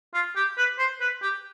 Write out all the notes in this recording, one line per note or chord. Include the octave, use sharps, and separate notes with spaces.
F4
G4
B4
C5
B4
G4